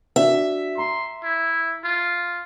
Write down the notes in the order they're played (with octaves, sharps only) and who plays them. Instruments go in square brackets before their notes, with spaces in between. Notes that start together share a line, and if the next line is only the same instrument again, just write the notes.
[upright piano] D4 F#4 [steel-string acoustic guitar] E5
[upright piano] A#5 [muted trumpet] C6
[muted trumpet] E4
F4